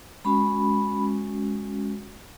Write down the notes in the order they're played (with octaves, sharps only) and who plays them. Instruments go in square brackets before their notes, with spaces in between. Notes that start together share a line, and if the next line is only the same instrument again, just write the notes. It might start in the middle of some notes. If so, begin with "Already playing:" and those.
[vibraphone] G#3 C#4 F#4 B5